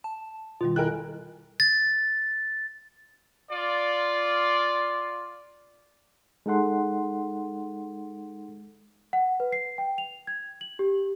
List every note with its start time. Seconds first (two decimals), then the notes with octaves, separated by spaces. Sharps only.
0.04 A5
0.61 B2 D#3 G3 F4
0.76 E4 A4 A#4 D#5 G5 G#5 F#6
1.60 A6
3.52 F4 D5
6.46 G#3 D#4 A4 F#5 C6
9.13 F#5
9.40 B4
9.52 C7
9.78 G5
9.98 F7
10.27 G#6
10.61 F#7
10.79 G4